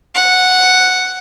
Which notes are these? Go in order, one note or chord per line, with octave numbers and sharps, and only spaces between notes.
F#5